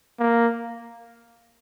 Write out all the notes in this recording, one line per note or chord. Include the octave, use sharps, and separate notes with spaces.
A#3